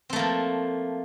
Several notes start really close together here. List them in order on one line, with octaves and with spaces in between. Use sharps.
C4 A3 A#3 F3